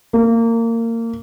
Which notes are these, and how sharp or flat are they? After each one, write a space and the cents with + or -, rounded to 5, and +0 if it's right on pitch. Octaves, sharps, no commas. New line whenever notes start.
A#3 -25